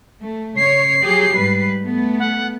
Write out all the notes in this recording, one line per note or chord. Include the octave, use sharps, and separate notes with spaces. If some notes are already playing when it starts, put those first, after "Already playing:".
A3
C#3 C#5 C7
F#3 G4 G#4
G#2 G3 B4
A3 B3
F#5